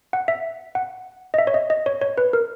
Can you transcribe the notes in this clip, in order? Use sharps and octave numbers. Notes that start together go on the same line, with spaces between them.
F#5
E5
F#5
D#5
E5
C#5
D#5
D#5
C#5
C#5
B4
A#4